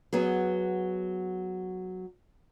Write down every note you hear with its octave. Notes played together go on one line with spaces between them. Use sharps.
F#3 B3 G#4